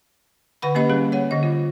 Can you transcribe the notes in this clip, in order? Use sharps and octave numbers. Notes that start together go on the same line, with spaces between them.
D3 B4 F#5 B5
A#3 C#4 G4 D#5 B5
G3 C#4 G#4
C#5 F#5
D3 D#5
F4